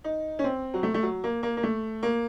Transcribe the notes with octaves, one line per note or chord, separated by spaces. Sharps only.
D#4
C#4
C4
F#3
A3
A3
F#3
A#3
A#3
A#3
A3
A#3